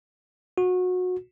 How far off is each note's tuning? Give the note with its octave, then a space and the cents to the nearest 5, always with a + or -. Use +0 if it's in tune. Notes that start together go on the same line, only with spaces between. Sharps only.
F#4 -25